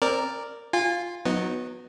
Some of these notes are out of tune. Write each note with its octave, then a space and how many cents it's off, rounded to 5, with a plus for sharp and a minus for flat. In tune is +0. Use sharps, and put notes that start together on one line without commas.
C4 +25 A#4 +0 D5 +0
F4 +0 G#5 -30
F#3 -25 B3 +0 D#4 +0